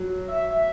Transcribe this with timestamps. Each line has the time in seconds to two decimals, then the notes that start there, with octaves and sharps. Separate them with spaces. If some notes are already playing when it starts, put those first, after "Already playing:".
Already playing: F#3
0.28 E5